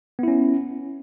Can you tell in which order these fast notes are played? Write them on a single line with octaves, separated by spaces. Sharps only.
B3 E4 C#4